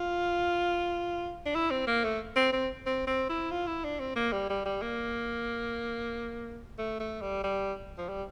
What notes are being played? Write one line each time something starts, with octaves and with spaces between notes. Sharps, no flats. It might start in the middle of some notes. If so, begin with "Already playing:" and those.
Already playing: F4
D4
E4
C4
A#3
A3
C4
C4
C4
C4
E4
F4
E4
D4
C4
A#3
G3
G3
G3
A#3
A3
A3
G3
G3
F3
G3